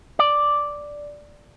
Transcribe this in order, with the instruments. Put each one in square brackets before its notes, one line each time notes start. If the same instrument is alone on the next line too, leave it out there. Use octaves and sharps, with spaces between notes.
[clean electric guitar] D5